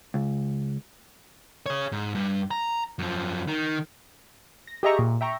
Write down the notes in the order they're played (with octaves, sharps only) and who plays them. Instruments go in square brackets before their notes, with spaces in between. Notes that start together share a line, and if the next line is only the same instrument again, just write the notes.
[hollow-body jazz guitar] C#2
[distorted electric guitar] G#4 C#5
G#2
G2
A#5
F#2 F3
D#3
[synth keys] A#6
G4 G#4 D#5 E5 A#5 C#6
A#2
E5 G5 A#5 C#6